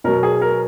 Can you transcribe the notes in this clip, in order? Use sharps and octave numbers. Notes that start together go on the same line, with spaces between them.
B2 F#3 A#4
G#4
A#4